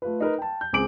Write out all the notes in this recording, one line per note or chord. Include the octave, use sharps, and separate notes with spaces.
A3 F4 B4
D#4 A#4 B4
G5 A5
G6
C#2 C4 G#4 D6 D7 F#7